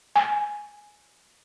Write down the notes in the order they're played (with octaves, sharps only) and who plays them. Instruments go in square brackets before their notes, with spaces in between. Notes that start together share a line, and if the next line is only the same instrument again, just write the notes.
[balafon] G#5